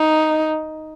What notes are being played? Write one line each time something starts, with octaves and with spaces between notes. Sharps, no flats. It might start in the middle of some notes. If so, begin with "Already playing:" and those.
Already playing: D#4